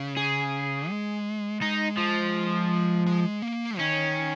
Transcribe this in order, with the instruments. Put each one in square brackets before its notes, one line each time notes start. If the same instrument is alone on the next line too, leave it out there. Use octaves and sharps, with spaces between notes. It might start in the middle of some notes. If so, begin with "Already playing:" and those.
Already playing: [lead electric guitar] C#3
[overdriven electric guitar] G#4
[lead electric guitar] G#3
[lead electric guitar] G#3 [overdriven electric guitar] D#4
[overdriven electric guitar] F3
[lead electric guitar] G#3
A#3
[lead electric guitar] D#3 [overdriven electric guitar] C#4